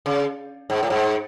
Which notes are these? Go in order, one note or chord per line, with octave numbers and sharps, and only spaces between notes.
C#3
G#2
A2
G#2